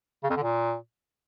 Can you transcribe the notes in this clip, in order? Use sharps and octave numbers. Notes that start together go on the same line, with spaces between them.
C#3
F2
D3
A#2